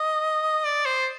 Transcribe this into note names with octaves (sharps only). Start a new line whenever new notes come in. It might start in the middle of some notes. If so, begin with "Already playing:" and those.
Already playing: D#5
D5
C5